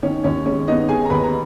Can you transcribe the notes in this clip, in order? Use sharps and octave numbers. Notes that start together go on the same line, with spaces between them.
D#3 C#4 C#5
D#2 C#4 C#5
G#3 C#4 C#5
B3 D#4 D#5
D#3 G#4 G#5
A#5
D#2 B4 B5
A#5